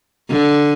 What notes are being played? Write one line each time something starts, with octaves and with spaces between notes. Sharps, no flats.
D3